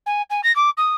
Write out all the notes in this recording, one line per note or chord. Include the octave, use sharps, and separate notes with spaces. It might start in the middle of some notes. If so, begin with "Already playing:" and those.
G#5
G#5
A#6
D6
D#6